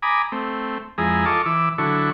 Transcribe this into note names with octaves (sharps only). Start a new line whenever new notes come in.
G#5 A#5 B5 D6 D#6
A3 C4
F2 G#3 E4 G#4 A#5
F4 A4 D#5 A5 C#6 D6
E3 D6 E6
D3 F#3 E4 A4 C#6